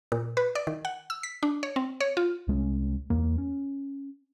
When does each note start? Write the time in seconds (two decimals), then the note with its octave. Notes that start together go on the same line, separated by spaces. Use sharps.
0.12 A#2
0.37 B4
0.55 D5
0.67 D#3
0.85 F#5
1.10 E6
1.23 B6
1.43 D4
1.63 C#5
1.76 C4
2.00 C#5
2.17 F4
2.48 C2 G#3 C#4
3.10 E2 A#3
3.38 C#4